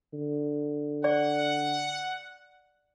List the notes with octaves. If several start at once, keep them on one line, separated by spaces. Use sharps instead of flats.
D3
D5 F#5